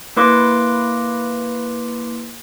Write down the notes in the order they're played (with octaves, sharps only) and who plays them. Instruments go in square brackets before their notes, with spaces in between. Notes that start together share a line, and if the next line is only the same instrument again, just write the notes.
[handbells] A#3 E4 B4 C6 D6 A#6